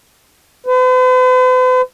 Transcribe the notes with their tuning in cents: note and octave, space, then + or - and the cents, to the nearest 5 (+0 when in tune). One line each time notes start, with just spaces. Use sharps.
B4 +45